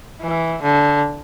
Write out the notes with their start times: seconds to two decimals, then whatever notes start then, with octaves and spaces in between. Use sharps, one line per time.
0.21 E3
0.62 D3